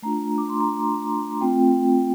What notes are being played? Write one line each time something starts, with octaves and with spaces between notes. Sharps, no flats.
A3 D4 F4 A#5
D6
C6
A#5
A3 C4 F4 G5